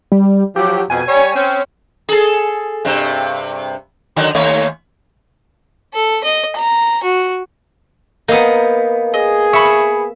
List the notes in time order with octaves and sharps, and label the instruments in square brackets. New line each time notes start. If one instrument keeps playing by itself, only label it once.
[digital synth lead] G3
[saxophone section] F3 F#3 [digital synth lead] G4
[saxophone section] F2 B2 [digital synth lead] G#5
[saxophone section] G3 C#5
C4 C#4
[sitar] G#4 A4
G2 C3
D3 D#3 F#3
D#2 A3 C#5
[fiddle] A4
D#5
A#5
F#4
[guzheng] A#3 B3 [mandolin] D#4 D#6
[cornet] G#4 [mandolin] D#5
[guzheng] E5 [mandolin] B5 C#6